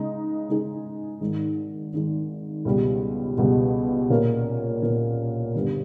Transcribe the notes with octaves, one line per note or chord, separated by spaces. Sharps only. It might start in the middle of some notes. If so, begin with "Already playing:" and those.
Already playing: C#3 G#3 D#4
C#3 G#3 D#4 G#4
G#1 G#2 D#3 G#3
G#1 G#2 D#3 G#3
C#2 B2 G3
C#2 B2 G3
A#2 A#3 C#4
A#2 A#3 C#4
G1 G2 G3 B3